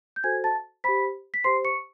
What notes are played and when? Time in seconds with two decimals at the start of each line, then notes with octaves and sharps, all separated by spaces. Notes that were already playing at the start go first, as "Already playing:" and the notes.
0.16 G6
0.24 F#4 A4 C5 G#5 G#6
0.44 A5 A6
0.84 G4 C5 B5 B6
1.34 B6
1.44 G4 C5 C6 C7
1.65 C#6 C#7